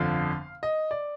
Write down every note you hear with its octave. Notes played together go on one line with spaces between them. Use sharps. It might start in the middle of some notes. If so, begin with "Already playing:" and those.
Already playing: G1 F2 D3 F3 F5
D#5
D5